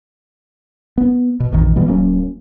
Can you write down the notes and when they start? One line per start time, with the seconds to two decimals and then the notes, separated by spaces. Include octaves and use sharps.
0.98 B3
1.40 B2
1.52 A#1 F2 D#3 E3
1.76 B2 E3 G3 B3
1.87 D1 F#3 A#3 C#4